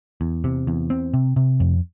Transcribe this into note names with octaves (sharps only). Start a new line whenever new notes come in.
E2
C3
E2
C4
C3
C3
F2